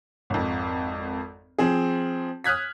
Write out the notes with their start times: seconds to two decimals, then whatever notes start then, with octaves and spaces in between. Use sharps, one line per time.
0.30 G#1 F2
1.59 F3 C4 G#4
2.44 D#6 F6 F#6 G#6 B6